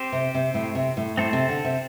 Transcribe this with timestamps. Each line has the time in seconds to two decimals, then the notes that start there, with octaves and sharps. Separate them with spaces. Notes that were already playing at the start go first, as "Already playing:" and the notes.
Already playing: C4 G4 C5
0.12 C3
0.34 C3
0.54 A2
0.75 C3
0.97 A2
1.17 A2 C4 A4 C5
1.33 C3
1.49 D3
1.65 C3